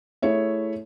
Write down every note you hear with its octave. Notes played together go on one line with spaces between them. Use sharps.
A3 E4 G#4 C#5 E5